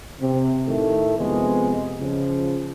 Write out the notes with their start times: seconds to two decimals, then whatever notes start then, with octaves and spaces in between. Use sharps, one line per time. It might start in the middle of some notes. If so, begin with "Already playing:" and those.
0.21 C3
0.67 A2 D#3 A3
1.17 F2 C3 G#3 B3
2.00 C#3 F3